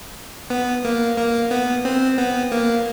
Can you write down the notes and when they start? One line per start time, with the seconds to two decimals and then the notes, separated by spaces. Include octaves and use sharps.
0.50 B3
0.85 A#3
1.17 A#3
1.51 B3
1.85 C4
2.18 B3
2.52 A#3